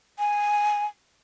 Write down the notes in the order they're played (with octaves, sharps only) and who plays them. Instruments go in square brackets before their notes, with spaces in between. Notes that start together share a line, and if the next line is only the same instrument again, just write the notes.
[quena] G#5